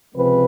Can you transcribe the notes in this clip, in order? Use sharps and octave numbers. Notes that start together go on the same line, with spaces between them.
C#2 C3 F3 G#3 C4 B4